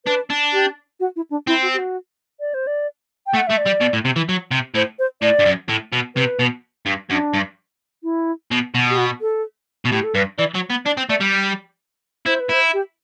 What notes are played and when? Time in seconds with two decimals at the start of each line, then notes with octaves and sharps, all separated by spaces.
0.05 D4 B4
0.30 D4
0.53 G4
1.00 F#4
1.16 E4
1.30 D4
1.47 C4 E4
1.62 F#4
1.74 G4
1.78 F#4
2.40 D5
2.54 C5
2.67 D5
3.27 G5
3.34 A3 F#5
3.47 A3 E5
3.57 D5
3.66 G3
3.81 B2
3.93 A2
4.05 C3
4.16 E3
4.29 F#3
4.51 C3
4.75 A2 C5
4.99 C5
5.22 A2 D5
5.39 G2
5.46 F#2
5.69 A2
5.93 B2
6.16 C3 B4
6.39 B2
6.86 G2
7.09 F#2 D4
7.34 G2
8.03 E4
8.51 B2
8.75 B2
8.90 G4
8.98 F#4
9.21 A4
9.85 B2
9.91 A2 G4
10.04 A4
10.15 G2 B4
10.38 E3 D5
10.54 F#3
10.70 B3
10.85 D4 D5
10.97 C4
11.09 A3 D5
11.21 G3
12.26 E4 C5
12.40 B4
12.49 E4 C5
12.73 G4